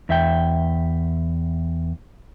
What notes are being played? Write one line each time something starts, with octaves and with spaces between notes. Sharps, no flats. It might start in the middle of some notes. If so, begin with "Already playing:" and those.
E2 E5 G5